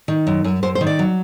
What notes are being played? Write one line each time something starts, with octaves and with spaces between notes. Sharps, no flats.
D#3
F#2
F#2
F#2 C5
C5
D#3
D5
F#3